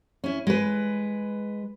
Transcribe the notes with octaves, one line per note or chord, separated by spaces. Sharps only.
C#4 E4
G#3 B4